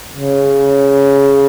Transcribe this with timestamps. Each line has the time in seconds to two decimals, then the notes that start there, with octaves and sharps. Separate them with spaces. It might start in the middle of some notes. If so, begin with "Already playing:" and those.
0.15 C#3